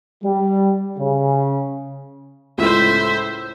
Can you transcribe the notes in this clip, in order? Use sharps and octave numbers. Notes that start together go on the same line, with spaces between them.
G3
C#3
C#2 A2 C5 E5